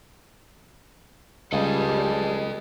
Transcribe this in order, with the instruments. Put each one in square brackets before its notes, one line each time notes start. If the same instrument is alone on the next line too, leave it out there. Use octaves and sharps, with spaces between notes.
[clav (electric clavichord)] C#2 [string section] G3 [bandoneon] G#4 A5 [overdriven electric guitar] A4 D#5